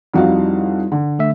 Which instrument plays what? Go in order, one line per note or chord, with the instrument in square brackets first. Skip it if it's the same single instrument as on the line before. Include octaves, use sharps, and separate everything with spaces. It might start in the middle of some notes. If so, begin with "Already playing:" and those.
[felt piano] F2 F#4 F5 [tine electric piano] G3 D#4 E4
[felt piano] D3
[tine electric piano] D3 A3 E5